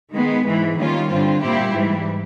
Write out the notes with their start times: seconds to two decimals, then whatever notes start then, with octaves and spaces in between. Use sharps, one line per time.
0.12 D#3 G#3 B3
0.45 G#2 E3 G#3
0.77 D#3 G3 A#3 C#4 F4
1.09 G2 D3 G3 C4 F4
1.41 A#2 G3 C4 E4 G4
1.73 G#2 E3 G3